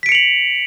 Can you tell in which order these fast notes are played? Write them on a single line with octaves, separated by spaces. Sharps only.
B6 D7 C#7 F7 F#7